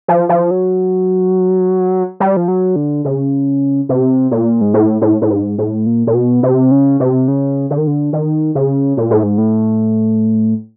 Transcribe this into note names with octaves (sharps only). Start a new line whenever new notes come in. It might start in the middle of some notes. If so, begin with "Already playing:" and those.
F3
F3
F#3
G3
F3
F#3
D3
C#3
C3
A#2
G#2
A2
A2
A2
G#2
A2
A#2
A#2
B2
C3
C#3
C3
C#3
D3
D#3
D3
D#3
C#3
A#2
A2
G#2
A2